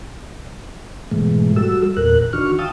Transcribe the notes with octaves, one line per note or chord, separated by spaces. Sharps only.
G#2 B2 E3 G#3 A3
G3 F#4 A4 E6
E2 A#2 A#4 F#6
D#3 D4 F#4 C#6 F6
F5 G5 A5 D#6 E6